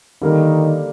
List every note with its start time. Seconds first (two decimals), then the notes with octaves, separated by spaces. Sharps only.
0.22 D3 D#3 G3 A#3